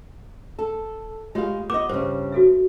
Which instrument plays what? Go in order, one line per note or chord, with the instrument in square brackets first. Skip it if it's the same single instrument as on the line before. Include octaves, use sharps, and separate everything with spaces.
[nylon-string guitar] A4
[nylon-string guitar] G#3 F5 [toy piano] F4 G4 C#5
[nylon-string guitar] B3 D#5 [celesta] D6
[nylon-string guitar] G2 C#3 [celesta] C5
[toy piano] F#4 A4 E5